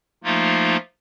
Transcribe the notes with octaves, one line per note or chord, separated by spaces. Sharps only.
F3 A3 A#3 D#4 F4